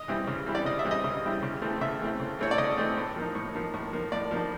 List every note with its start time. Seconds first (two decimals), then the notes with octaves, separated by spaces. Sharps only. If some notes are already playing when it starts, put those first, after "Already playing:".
Already playing: D#5
0.08 E3 G3 C4 E4
0.27 C#3
0.46 E3 G3 C4 E4
0.55 D5
0.65 C#3 D#5
0.79 E5
0.85 E3 G3 C4 E4
0.91 D#5
1.04 C#3
1.23 E3 G3 C4 E4
1.42 C#3
1.62 E3 A3 C4
1.81 C#3 E5
2.01 E3 A3 C4
2.20 C#3
2.39 E3 A3 C4 C#5
2.51 D5
2.58 C#3 D#5
2.77 E3 A3 C4
2.97 A2
3.16 F3 A#3 D#4
3.35 A2
3.54 F3 A#3 D#4
3.74 A2
3.92 F3 A#3 D#4
4.12 A2 D5
4.31 F3 A#3 D#4